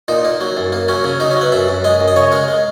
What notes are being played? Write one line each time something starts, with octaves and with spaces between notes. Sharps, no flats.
A#2 D#4
A#3
F#3
F#2
A#3
F#3 C#4
C#3
F#3 D#4
C#4
F#3
B4
F#2 E5
F#2
G#3 D#5
F#2
D#5
C#3 C#5
G#3 A#4
G#3